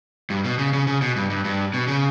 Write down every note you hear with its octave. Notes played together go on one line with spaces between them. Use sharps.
G2
B2
C#3
C#3
C#3
B2
G2
G2
G2
B2
C#3